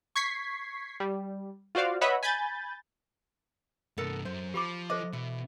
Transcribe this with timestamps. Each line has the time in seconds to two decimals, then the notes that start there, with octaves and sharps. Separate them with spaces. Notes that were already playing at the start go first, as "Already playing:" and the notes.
0.16 C#6 G#6 B6 C7
1.00 G3
1.75 F4 F#4 C5 D5 F5
2.01 B4 C#5 D#5 E5 F#5 B5
2.23 G#5 B5 G6 A6
3.97 C2 G2 B3 A4 A#4
4.25 F#2 C5
4.54 F3 G4 B5 D6
4.90 A4 C5 D#5 D6
5.13 B2 E3